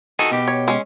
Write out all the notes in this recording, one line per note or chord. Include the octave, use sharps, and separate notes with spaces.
D#3 F#4 G#4 A4
B2 G4
C#5
G#3 C#4